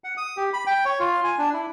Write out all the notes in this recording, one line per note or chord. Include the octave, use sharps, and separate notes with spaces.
F#5
D#6
G4
B5
G5
C#5
F4
G#5
D4
E4